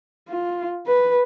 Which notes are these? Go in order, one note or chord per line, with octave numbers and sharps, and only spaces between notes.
F4
B4